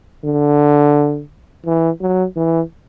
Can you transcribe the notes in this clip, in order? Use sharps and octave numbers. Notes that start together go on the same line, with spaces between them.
D3
E3
F#3
E3